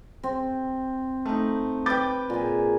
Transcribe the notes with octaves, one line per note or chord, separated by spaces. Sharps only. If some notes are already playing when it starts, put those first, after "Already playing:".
C4
A3 D#4
B4 G5 D6 G6 A6
A#2 G#4